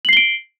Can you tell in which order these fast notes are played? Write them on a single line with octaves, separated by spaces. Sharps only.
F#7 C7 G7 D7